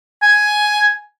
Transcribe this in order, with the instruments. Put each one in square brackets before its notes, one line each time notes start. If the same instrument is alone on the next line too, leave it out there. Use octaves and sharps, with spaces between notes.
[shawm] G#5